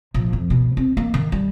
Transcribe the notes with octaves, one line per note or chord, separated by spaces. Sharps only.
A#1
F2
B2
C4
A#3
D#3
G3